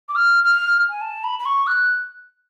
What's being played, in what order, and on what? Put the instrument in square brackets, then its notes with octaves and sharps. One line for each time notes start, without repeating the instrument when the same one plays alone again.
[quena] D6
F6
F6
G#5
A5
B5
B5
C#6
F#6